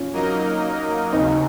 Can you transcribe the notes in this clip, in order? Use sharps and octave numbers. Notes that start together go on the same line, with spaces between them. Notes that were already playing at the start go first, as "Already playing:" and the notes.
Already playing: C#4 F4
F#3 A#3 D#4 A#4 D#5
D#2 C#3 F#3 C4 D#4